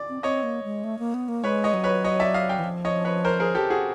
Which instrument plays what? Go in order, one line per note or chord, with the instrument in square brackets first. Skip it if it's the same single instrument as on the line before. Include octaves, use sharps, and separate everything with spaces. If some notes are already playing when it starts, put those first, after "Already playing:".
Already playing: [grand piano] D5
[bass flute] C4
[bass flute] C4 [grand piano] C#5 D#5
[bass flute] A#3
G#3
A3
A#3
B3
A#3
[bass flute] G#3 [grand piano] B4 C#5
[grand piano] C#5 D#5
[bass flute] F#3
[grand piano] B4 C#5
C#5 D#5
D5 E5
D#5 F5
F5 G5
[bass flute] E3
F3
[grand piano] C#5 D#5
B4 C#5
A#4 C5
G#4 A#4
G4 A4
F#4 G#4